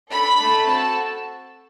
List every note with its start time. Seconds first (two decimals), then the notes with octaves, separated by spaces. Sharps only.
0.10 D4 A4 B5
0.39 A3 D4 A4
0.67 C4 F#4 A4 A5